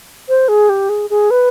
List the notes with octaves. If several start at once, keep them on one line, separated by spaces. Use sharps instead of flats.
C5
G#4
G4
G#4
G#4
B4